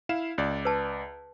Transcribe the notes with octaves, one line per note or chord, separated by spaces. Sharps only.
E4 F5 E7
C#2 D5
B4 A5